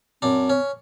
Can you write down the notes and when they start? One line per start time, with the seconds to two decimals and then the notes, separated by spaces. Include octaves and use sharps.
0.22 F#2 C4 D4
0.50 C#4